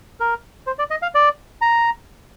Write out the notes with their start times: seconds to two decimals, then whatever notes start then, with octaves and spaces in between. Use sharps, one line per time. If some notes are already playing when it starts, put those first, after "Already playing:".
0.20 A#4
0.67 C5
0.79 D5
0.91 D#5
1.02 F5
1.15 D5
1.62 A#5